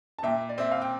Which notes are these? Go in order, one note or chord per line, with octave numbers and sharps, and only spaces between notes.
A5
A#2 E5 G5
D5
C4 E5
F5
G5